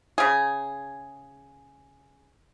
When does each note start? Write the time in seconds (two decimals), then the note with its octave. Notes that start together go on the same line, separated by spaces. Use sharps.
0.18 C#3 G#4